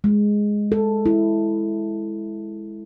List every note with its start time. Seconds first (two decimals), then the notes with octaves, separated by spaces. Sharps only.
0.04 G#3
0.72 A4
1.06 E4